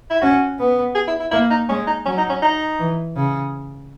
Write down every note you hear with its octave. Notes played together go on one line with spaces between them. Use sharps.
E4
C#4 F#4
B3
G#4
E4
E4
A#3 E4
D#4
G#3 C#4
D#4
F#3 C#4
D#4
C#4
D#4
E3
C#3